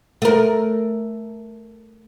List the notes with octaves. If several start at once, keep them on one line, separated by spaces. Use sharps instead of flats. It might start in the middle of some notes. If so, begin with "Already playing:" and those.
A3 A#4